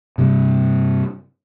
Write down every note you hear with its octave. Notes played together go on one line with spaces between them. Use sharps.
G2 C3 G3